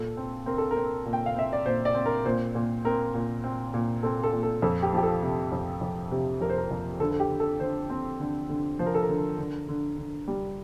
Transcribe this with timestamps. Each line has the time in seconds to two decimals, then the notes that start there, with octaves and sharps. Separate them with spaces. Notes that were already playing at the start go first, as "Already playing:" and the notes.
Already playing: A#2 A4
0.17 C4
0.46 C4 A#4
0.58 A4
0.71 A#4
0.76 C4
1.06 A#2
1.13 G5
1.26 F5
1.36 C4 E5
1.53 D5
1.66 A#2 C5
1.85 D5
1.95 C4
2.06 A#4
2.25 A#2 C5
2.55 A#2
2.85 C4 A#4
3.14 A#2
3.44 C4
3.74 A#2
4.03 C4 A4
4.23 A4
4.32 A#2
4.43 A4
4.62 F2 A4
4.82 G4
4.93 F3 G4
5.03 A4
5.23 C3
5.52 F2
5.81 F2
6.12 C3
6.41 F2 A#4
6.50 C5
6.58 A#4
6.71 F2
7.00 D3 A4
7.11 A4
7.20 G4
7.31 D3
7.40 A4
7.60 D3 C5
7.90 C4
8.20 D3
8.49 D3
8.79 F3 C5
8.86 A#4
8.95 A4
9.03 A#4
9.09 D3
9.38 D3
9.68 D3
9.97 D3
10.28 G3